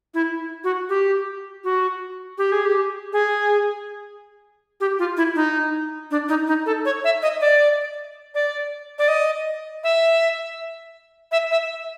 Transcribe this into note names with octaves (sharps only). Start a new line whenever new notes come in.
E4
F#4
G4
F#4
G4
G#4
G4
G#4
G4
F4
E4
D#4
D4
D#4
D#4
A4
C#5
E5
D#5
D5
D5
D5
D#5
E5
E5
E5